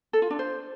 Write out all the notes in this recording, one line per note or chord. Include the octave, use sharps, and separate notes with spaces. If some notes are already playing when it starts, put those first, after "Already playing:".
A4
F4
D4
C5